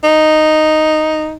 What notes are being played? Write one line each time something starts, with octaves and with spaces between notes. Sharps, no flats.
D#4